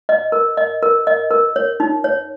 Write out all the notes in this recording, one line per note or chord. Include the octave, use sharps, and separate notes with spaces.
D#5
A#4
D#5
A#4
D#5
A#4
C#5
D#4
C#5